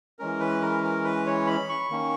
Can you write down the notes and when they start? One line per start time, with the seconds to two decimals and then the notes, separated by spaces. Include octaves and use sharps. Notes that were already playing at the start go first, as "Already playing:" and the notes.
0.19 E3 G#3 C#4 A#4
0.40 B4
0.62 A#4
0.84 A#4
1.04 B4
1.27 C#5
1.47 B5
1.69 C#6
1.90 D#3 A#3 C#4